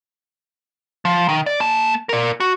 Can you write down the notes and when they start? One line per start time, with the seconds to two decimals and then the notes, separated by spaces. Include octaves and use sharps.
1.05 F3
1.29 D#3
1.46 D5
1.60 A#3 A5
2.09 A#4 D5
2.40 F#4